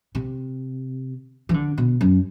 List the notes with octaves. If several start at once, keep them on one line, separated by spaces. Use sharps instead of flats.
C3
E3
D3
B2
F#2